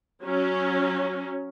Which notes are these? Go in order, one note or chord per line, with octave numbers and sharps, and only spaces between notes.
F#3 C#4